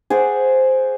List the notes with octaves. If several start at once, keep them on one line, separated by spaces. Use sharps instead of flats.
G#4 C5 D5 F#5